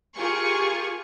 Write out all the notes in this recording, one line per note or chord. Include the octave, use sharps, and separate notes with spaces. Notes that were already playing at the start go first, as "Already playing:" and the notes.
F4 G4 G#4 A#4 G#5 C#6